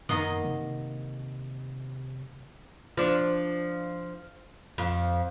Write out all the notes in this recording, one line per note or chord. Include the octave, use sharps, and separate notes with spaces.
F#2 D#3 A#3 B3 D#5
C3
F3 D4
F2